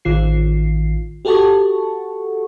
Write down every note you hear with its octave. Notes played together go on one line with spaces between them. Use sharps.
A1 D#3 F4 C7
F#4 G4 A4 F#5 A5 C#6